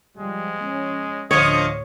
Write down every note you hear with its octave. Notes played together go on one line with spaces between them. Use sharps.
F3 G3 G#3
C#4
D2 A2 D3 F3 C#5 D#5